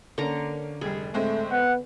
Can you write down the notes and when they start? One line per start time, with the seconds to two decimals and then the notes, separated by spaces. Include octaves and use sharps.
0.18 D3 A#3 C#4 A#5
0.81 F1 G3 G#4
1.14 A2 G#3 A3 C4
1.51 B3 F#5